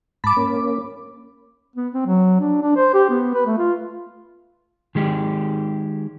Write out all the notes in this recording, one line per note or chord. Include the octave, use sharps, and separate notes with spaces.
G#2 A5 B5 D6
A#3 C#4
B3
C4
F#3
D4
D4
C5
G4
B3
B4
A3
F4
D#3 G#3 G4